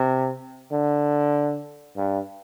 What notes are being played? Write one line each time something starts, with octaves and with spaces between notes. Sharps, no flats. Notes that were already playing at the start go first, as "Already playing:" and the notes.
Already playing: C3
D3
G2